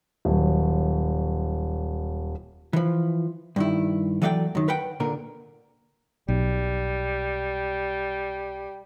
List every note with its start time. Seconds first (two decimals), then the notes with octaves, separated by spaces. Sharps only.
0.25 D#1 F#3
2.73 E3 F3
3.56 G2 D#3 E4
4.22 E3 F#3 A3 D5 E5 G5
4.55 F#2 D#3
4.68 A#4 B4 F#5 G5
5.00 A#2 D3 A#4
6.28 B1 G3